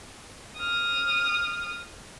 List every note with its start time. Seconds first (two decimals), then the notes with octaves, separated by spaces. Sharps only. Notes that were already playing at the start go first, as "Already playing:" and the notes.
0.57 D#6 F6